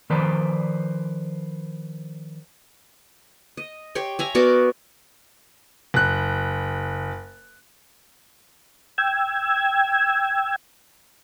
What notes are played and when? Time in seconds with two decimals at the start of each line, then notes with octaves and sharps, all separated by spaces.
0.10 D#3 F3 B4 C5 D5
3.57 D#5
3.95 G4 C#5 G5 C6
4.19 E5 G#5 A#5
4.35 B3 F#4 A#4 D5
5.94 F#1 F#6
8.98 G5 E6 G#6